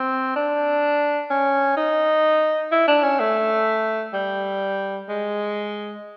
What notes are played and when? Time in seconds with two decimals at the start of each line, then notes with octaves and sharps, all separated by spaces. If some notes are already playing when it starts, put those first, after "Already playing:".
Already playing: C4
0.36 D4
1.30 C#4
1.77 D#4
2.71 E4
2.87 D4
3.03 C#4
3.20 A3
4.13 G3
5.08 G#3